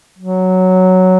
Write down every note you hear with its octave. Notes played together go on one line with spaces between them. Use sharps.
F#3